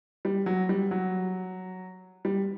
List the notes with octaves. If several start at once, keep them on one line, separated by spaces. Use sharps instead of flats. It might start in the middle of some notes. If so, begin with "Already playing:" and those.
G3
F#3
G3
F#3
G3